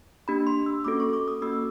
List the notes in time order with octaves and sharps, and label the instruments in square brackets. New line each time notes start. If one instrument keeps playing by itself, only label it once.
[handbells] A#3 D4 G4 B5
C6
E6
A#3 C#4 F#4 A4 D6
C#6
D6
D#6
A#3 C#4 F#4 A4 E6